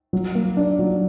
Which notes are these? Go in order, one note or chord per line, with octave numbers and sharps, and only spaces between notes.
F#3
A#3
D4
F#3